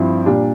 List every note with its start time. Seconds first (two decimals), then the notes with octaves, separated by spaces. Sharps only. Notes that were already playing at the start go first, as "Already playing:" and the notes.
Already playing: G2 F3 C4 E4
0.26 A#2 G3 D4